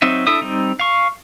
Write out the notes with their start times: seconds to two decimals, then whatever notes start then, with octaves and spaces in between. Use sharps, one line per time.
0.02 F#3 C4 D#4 E5
0.27 D4 E4 A4 E5 D#6
0.42 G3 C4 D#4
0.80 F5 C#6